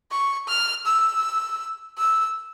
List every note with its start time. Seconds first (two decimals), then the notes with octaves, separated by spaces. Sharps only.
0.11 C#6
0.48 F6
0.86 E6
1.98 E6